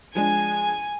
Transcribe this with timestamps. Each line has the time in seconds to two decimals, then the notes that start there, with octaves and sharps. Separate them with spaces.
0.15 F3 G#3 D4 G#5